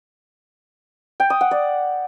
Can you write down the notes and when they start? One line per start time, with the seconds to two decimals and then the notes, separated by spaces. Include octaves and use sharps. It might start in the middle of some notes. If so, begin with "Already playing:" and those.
1.20 G5
1.30 D#6
1.41 F#5
1.51 D5